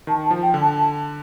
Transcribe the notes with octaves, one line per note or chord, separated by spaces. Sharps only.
D#3 A5
A5
F3
G5
D3
A5
A5